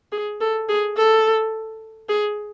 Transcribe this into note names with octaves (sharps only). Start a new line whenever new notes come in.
G#4
A4
G#4
A4
G#4